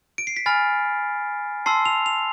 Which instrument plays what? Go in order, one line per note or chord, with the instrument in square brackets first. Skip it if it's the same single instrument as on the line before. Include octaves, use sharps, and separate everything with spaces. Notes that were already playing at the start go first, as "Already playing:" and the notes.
[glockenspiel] D7
C7
B6
G#5 B5 F6 A6
A5 C6 E6 C7
F7
F7